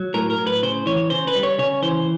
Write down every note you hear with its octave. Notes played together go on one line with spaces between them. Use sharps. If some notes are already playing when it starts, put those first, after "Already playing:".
Already playing: F#3
A2 A#4
A#4
A2
B4
C#3 C5
E3 C#5
C#3 C5
B4
G3
C#5
C#3 C#5
E3 C5